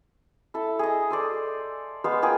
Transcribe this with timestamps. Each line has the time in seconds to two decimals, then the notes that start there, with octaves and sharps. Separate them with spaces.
0.54 E4 A4 A5
0.79 G#4 D#5
1.10 A4 C5 D5
2.04 G#3 B3 C5 F5
2.22 A#3 F4 G#4 G5